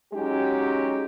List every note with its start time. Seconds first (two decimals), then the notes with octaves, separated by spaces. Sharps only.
0.14 F#3 G#3 C#4 D#4 G4